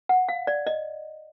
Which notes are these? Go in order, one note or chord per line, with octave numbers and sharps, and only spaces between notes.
F#5
F5
D5
D#5